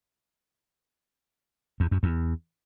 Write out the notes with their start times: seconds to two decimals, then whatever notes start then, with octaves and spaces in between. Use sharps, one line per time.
1.80 E2
1.91 F#2
2.03 E2